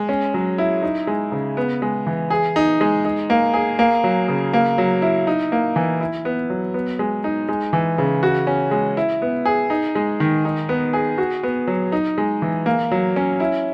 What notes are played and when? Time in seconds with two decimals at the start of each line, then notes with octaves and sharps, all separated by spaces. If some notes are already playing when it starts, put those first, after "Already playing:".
Already playing: G#3
0.09 C#4
0.34 F#3
0.58 E4
0.82 D#4
1.07 G#3
1.32 C#3
1.57 B3
1.82 G#3
2.06 E3
2.30 G#4
2.56 D#4
2.81 G#3
3.05 D#4
3.30 A#3
3.54 G#4
3.79 A#3
4.04 F#3
4.28 C#3
4.53 A#3
4.78 F#3
5.02 E4
5.27 D#4
5.52 A#3
5.76 E3
6.00 E4
6.25 B3
6.50 F#3
6.74 B3
6.99 G#3
7.24 D#4
7.49 G#3
7.73 E3
7.98 C#3
8.23 F#4
8.47 C#4
8.71 G#3
8.97 E4
9.22 B3
9.45 G#4
9.70 D#4
9.95 G#3
10.20 D#3
10.45 D#4
10.69 B3
10.93 G#4
11.18 F#4
11.43 B3
11.67 F#3
11.92 D#4
12.18 G#3
12.42 E3
12.66 A#3
12.91 F#3
13.16 C#4
13.40 E4